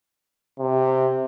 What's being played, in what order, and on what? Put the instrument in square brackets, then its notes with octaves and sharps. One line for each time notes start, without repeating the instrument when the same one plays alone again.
[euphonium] C3